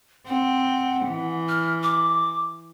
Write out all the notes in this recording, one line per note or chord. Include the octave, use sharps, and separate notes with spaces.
C4 F#5
E3
F6
D6